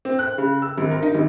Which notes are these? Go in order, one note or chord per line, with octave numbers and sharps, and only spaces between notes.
C4
F#6
C#3
E6
G#1
A#4
D#4
G#1